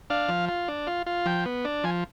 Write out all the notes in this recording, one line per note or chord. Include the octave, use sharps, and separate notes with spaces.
D4 F5
F3
F4
D4
F4
F4
F3 G5
B3
D4
F3 G#5